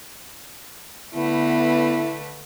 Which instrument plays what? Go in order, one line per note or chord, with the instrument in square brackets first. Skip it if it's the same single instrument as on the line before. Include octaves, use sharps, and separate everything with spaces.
[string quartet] D3 A3 B4 [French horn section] B3 [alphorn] E4